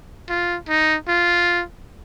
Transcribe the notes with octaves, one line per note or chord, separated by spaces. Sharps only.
F4
D#4
F4